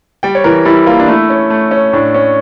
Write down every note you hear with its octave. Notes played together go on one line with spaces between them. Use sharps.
G3 G5
C#5
E3 A#4
G3 E4
A#3 F4
D4
A3 E4
C#4
A3
C#4
A2 D4
C#4